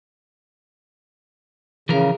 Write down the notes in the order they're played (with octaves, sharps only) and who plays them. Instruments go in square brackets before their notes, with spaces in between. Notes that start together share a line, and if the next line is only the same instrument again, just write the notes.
[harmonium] C#3 [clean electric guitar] E3 F3 A#4